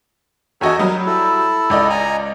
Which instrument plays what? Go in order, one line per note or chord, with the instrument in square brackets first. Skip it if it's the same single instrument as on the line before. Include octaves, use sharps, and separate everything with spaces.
[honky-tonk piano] E2 F#4 D#5 [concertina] A4 C#5 G#5
[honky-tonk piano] F#3 G3 [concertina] A#4 D#5
[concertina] E4 A4
[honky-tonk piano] C#2 D5 D#5
[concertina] G#5 A#5